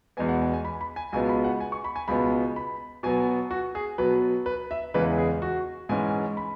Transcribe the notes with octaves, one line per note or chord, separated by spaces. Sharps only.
E2 B2 G#3 B3 G#5
F#5
G#5
G#5
B5
B5
G#5
C#2 B2 G#3 B3 G#5
B5
F#5
G#5
C#6
B5
G#5
C#2 B2 G#3 B3 B5
B5
B2 F#3 B3 G#5
F#4
G#4
B2 F#3 B3 B4
B4
E5
E2 C#3 E3 G#3 B4
G#4
F#4
G#2 E3 G#3 C#4 G#5
B5